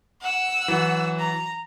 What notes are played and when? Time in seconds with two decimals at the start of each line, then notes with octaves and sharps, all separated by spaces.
0.21 F#5 E6
0.68 E3 F#3
1.19 A#5